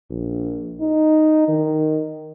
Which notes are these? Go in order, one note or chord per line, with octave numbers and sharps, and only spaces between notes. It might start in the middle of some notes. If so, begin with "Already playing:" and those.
A#1
D#4
D#3